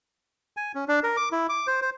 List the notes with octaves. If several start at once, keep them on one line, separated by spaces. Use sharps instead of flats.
G#5
C#4
D4
A#4
D6
E4
D6
C5
C5